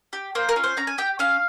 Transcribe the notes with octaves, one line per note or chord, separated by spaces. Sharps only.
G4
A#3 C5
A#4
C#4 F4
C5
C#4 A#5
G#5
G4 G5
C#4 F5